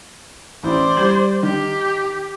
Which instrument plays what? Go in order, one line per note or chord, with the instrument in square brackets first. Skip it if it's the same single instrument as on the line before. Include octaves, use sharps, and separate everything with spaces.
[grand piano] A1 E4 [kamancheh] C5 D5
[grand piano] G3 G#6 F#7
[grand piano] D#3 [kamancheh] G4